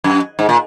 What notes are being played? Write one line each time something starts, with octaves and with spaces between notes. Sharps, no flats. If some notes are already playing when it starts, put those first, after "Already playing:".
F#2
G#2
A#2